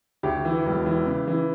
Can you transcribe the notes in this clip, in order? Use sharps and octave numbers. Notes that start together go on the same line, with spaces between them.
D2 G4
E3
E1
E3
C#3
E3